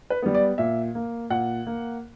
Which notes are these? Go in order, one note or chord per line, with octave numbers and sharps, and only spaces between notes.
B4
G3 B3
D5
A#2 E5
A#3
A#2 F#5
A#3